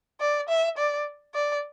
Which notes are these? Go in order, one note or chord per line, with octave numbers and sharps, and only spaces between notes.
D5
E5
D5
D5